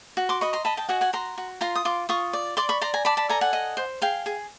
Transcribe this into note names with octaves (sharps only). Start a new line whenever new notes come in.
F#4
C6 D6
D#5 B5 C#6
A#5 C6
D#5 A5 B5
G5 A5
F#4 F#5 G#5
F#5 G#5
F#4 A#5 C6
F#4
F4 A#5 C6
D#6
F4 C6 D6
F4 C#6 D#6
D5
D5 C6 D6
B5 C#6
D5 A#5 C6
G#5 A#5
D5 A5 B5
A5 B5
A4 G#5 A#5
F#5 G#5
D#5
C5
G#4 F5 G5
G#4